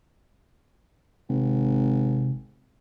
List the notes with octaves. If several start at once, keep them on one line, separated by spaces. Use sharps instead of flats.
G#1 C3